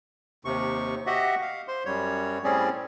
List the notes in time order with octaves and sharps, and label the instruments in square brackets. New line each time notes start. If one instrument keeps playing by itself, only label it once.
[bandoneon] D#2 C3 C#6
F#4 G4 D#5 E5 F#5
F5
C5 C6
F#2 G3 C#5
A2 G3 C4 C#4 G#4 D5